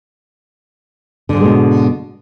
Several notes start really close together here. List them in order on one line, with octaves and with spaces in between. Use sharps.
D3 G#2 A3 G#3 B2